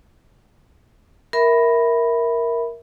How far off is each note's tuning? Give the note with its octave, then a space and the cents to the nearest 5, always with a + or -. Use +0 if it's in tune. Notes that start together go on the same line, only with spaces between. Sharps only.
A#4 +5 E5 -10 B5 +0